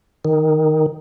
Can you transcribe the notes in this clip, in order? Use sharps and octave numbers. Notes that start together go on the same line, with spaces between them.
D#3